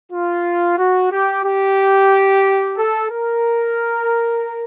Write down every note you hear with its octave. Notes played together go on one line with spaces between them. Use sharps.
F4
F#4
G4
G4
A4
A#4